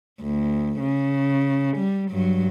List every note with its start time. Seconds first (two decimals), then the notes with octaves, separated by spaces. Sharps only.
0.22 D2
0.80 C#3
1.78 G3
2.11 G2 F#3